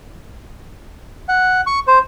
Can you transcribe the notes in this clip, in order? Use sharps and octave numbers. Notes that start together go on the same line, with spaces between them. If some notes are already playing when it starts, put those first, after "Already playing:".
F#5
C#6
C5